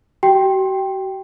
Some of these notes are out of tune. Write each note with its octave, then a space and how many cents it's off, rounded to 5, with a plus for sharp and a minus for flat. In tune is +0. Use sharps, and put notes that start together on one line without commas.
F#4 +45 G5 +0